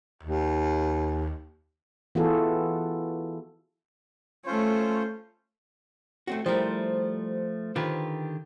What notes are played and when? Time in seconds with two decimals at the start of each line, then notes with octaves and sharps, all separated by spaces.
0.23 D#2
2.15 E3 B3 F4 F#4 G#4 A4
4.46 A3 C#4 F4 C5 C#5
6.27 A3 C4 F#4
6.46 F3 G3 A3 E4 A#4 C5
7.76 D3 D#3 F4 G4 B4